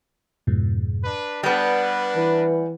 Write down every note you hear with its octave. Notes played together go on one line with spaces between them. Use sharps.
F2 G#2 B2
D4 B4
G3 B3 D4 B4 F6 A#6
E3